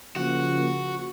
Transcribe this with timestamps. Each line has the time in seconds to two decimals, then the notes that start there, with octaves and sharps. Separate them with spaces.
0.16 C#3 F3 A#3 F#4